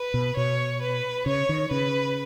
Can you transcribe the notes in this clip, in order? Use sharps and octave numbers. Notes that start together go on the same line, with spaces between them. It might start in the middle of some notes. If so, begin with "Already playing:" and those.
Already playing: B4
B2
B2 C#5
B4
C#3 C#5
D#3
C#3 B4